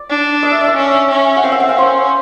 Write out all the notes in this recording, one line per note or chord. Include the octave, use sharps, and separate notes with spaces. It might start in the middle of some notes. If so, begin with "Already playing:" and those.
Already playing: D5
D4
D#5
E5
E5
C#4
C#4
F#5
C4 F5
E5
F#5
F5
C#4 C5